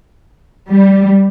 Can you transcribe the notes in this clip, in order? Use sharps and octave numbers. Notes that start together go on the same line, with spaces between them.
G3